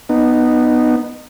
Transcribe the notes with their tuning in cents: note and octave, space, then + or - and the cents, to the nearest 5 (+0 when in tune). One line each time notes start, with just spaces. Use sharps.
B3 +0 D#4 -20